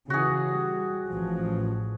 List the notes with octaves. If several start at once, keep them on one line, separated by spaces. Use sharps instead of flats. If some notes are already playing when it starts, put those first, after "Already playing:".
C#3 E3 F#4 G#4
G3
A1 F3